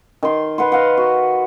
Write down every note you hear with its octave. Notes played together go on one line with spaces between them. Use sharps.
D#3 C6
B4 F#5 C6
D#5 F5 F#5
F#4